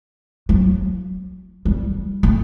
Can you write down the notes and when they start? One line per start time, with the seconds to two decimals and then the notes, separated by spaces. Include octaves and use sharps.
0.49 F#3
1.65 G3
2.23 A3